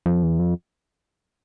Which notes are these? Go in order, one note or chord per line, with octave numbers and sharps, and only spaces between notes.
F2
E2
F2